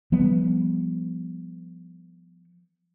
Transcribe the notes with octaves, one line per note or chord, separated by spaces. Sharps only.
F3 G3 B3